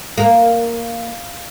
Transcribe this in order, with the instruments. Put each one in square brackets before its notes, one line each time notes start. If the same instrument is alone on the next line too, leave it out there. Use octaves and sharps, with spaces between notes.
[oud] A#3